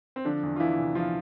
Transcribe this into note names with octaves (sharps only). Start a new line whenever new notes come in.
C4
D3 F3 D4
E2
F4
E2 E3 E4
C3
F3 F4